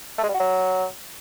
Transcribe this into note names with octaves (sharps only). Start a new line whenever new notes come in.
A3
G#3
G3
F#4
F#3